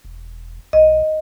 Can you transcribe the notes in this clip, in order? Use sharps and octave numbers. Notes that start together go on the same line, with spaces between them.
E1
B1 D#5